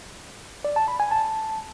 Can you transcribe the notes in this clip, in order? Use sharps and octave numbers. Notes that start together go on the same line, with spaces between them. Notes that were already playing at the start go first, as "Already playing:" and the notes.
D5
A5
B5
G#5
A5